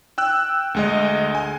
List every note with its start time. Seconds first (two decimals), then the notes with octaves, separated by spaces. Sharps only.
0.18 G5 E6 F#6
0.74 D2 G#3 D#5
1.35 G#5